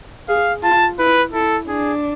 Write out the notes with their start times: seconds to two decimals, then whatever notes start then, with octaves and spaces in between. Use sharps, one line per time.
0.28 G#4 F5
0.63 F4 A5
0.99 E4 B4
1.33 E4 A4
1.68 D4 G#4